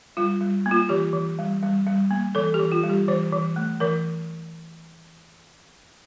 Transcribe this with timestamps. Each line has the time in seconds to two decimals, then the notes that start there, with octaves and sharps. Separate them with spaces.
0.17 G3 F4
0.41 G3
0.66 A#3
0.71 F4
0.89 E3 G4
1.13 E3
1.39 G3
1.63 G3
1.87 G3
2.11 A#3
2.35 E3 A4
2.54 G4
2.60 E3
2.72 F4
2.84 G3
2.89 G4
3.08 E3 C5
3.32 E3
3.56 A3
3.80 E3 A#4